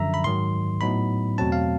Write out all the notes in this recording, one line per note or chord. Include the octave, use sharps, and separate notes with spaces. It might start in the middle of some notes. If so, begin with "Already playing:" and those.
Already playing: F#2 D3 F3 E5 A#5
B5
G#2 D#3 F#3 C6
A2 F#3 B3 D#4 B5
E2 B2 F#3 A3 C4 A5
F5